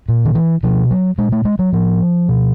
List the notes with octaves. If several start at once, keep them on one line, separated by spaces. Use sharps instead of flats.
A#2
D#3
E3
B2 F3
F#3
A#2 G#3
A3
G#3
F#3
A2 F3
B2